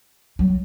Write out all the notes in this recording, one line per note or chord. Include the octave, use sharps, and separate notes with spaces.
F#3